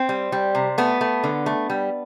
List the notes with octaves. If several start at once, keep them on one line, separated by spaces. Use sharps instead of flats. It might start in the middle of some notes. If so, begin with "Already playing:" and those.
Already playing: C4
G3
G3
C3
A3 B3
A3
D3
A3
G3